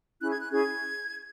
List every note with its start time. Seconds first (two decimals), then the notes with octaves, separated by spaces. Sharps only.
0.20 C#4 E4 G#4 F#6
0.30 G#6
0.39 F#6
0.50 C#4 E4 G#4 G#6